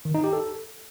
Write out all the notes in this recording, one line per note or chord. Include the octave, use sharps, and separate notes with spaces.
D#3
D#4
G4
A4